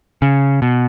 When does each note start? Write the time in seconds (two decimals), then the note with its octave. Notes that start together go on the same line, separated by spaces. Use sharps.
0.22 C#3
0.62 B2